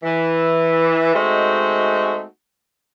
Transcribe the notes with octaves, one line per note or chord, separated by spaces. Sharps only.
E3
G#3 A3 C4 D#4 F#4